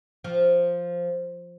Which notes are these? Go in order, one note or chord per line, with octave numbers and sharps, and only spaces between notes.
F3